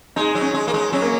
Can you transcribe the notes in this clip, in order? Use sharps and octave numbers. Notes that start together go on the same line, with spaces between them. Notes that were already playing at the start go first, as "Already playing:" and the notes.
G#3 D#4
F#3
C#4
G#3
A#3
G#3
F#3 C#4
A#3